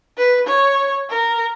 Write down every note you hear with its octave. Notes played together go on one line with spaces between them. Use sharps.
B4
C#5
A#4